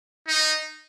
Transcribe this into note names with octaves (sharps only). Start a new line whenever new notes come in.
D#4